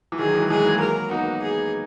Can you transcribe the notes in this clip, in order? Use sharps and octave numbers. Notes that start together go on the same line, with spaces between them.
E3
D#3 F#3 G#4
E3 G#3
E3 G#3 G#4
F#3 A#3
A#4
B3 D#4 F#4
G#4